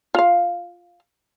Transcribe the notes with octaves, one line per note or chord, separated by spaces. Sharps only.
F4 F5